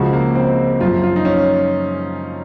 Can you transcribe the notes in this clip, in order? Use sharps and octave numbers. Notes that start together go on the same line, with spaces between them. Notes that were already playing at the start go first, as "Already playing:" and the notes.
Already playing: C#2 C#3 F3 F#4
A#3
C4
F#2 F3 F4
F4
D#4
C#4